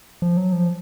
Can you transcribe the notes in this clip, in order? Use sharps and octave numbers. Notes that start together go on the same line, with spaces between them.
F3
F#3
F3